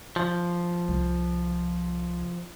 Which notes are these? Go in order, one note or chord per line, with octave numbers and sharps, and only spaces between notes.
F3
C2